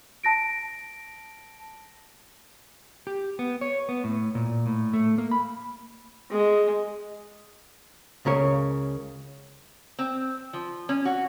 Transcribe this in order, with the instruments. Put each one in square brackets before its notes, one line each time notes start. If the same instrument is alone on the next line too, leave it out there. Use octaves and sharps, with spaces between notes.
[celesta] A5 A#6 D7
[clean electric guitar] G4
B3
C#5
B3
A2
A#2
A2
A3
A#3
B5
[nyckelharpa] G#3
[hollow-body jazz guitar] C#2 C#3 A#4 C#5
[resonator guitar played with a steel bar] C4
F3
C#4
F#4